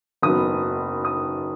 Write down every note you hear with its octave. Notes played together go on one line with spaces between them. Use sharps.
F#1 F#2 D#3 F#3 B3 D#6
D#6